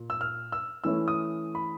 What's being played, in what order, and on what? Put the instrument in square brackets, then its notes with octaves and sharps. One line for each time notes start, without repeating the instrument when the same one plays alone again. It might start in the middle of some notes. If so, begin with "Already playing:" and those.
Already playing: [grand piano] A#2
E6
F6
E6
E3 A3 C#4 E4 E6
D#6
B5